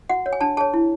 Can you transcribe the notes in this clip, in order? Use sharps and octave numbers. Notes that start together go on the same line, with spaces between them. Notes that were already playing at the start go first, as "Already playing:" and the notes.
F#4 F#5
C#5
G#5
D4 A5
G#4 C#5 A5
E4